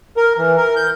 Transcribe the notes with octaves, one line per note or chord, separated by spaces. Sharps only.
A#4
E3
A#4
G6